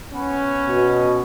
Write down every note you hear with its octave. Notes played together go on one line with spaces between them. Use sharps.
B3 C#4
B2